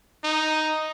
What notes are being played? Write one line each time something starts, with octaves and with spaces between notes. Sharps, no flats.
D#4